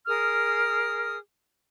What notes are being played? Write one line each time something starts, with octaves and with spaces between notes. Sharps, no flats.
G#4 A#4 D#6 F6